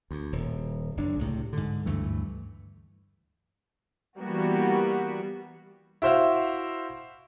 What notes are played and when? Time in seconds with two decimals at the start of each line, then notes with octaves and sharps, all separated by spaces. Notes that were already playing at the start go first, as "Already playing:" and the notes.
0.11 D2
0.32 D#1
0.97 F#1 D4
1.19 C#2 A2 C3
1.53 G#2 D3
1.86 D2 G2 E3 A3
4.20 E3 G3 A#3 B3 F#4
6.02 E4 F#4 C5 E5 F5